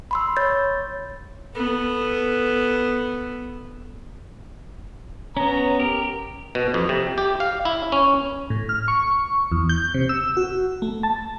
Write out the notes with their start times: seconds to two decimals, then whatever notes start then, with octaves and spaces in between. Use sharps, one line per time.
0.11 B5 C6 E6
0.37 C#5 G6 A6
1.54 B3 A4
5.37 B3 C#4 A#5
5.79 G4 A#4
6.55 B2
6.74 F2
6.89 C3
7.18 G4
7.40 F5
7.65 E4
7.92 C#4
8.50 A2
8.69 F6
8.88 C#6
9.52 E2
9.69 G6
9.94 C3
10.09 E6
10.37 F#4
10.82 A3
11.03 A5